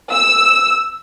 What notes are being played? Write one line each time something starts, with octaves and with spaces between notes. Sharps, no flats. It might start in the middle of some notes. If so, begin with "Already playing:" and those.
E6